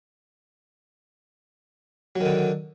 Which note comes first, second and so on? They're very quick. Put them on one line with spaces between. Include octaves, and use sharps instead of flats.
F#3 D#3 D3